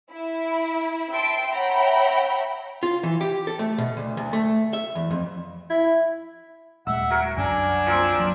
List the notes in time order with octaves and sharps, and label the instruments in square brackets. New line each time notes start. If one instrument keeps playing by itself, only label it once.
[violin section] E4
E5 G5 A5 C6 D7
C#5 E5 F#5 G5 A#5 B5
[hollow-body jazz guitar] F4
E3
G4
A4
A3
B2
D2
D2
A3
E5
E2
F2
[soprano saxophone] E4
[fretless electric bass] D#1 G#3 [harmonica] E5 F#5 [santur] E6
[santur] F#3 A#4
[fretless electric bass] C2 F#2 D3 [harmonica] D4 G#5
[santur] F3 A#3 C4
[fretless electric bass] F#3